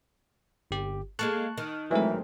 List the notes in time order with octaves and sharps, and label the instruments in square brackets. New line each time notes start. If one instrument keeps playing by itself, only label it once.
[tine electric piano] G1 G4
[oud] G#3 A#3 A4 [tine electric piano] A5 C#6 F#6
[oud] D#3
[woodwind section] E3 [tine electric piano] F#3 A#4 [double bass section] G#3 A3 C4